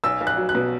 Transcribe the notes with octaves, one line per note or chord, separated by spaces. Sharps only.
B1 E6
B1
F#6
F#3
F#6
B2